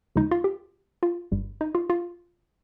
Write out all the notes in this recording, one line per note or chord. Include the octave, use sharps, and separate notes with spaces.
D#2 C#3 F3 G#3 D#4
F4
G4
F4
G1 G2 G3
D#4
F4
F4